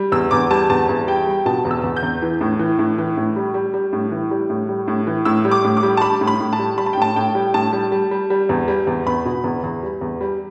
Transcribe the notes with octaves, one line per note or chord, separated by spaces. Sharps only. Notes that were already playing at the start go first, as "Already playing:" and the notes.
Already playing: G3
E2 E6
E2 D6
G3 A5
E2 A5
E2
G3 G5
G3
B2 A5
E2
E6
E2
G6
E2
E3
A2
E3
A2
E3
A2
G3
G3
G3
A2
E3
G3
A2
G3
A2
E3
A2 E6
G3
D6
A2
D6
G3
A5
G3 B5
A2
B5
A2
A5
G3
G3 B5
A5
G5
A2 A5
A2 G5
G3
A2 A5
G3
G3
G3
G3
E2
G3
E2
E2 B5
B2
E2
E2
G3
E2
G3